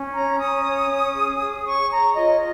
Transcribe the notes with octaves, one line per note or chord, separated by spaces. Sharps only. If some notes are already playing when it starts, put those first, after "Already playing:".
Already playing: C#4
C#5 A#5
C#4 D#6
C#5
C#4
G#4
G#4
C#5 C#6
C#5 A#5
F4 D#5